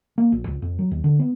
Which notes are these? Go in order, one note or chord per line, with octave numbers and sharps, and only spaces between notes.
A#3
A#1
C#2
F2
F#3
D#2
D3
B3